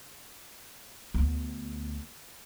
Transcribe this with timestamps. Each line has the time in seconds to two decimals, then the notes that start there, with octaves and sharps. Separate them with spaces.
1.14 D2 B3